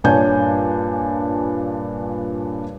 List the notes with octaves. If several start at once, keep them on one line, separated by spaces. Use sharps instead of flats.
G2 A#2 D4 C#5 G#5 G6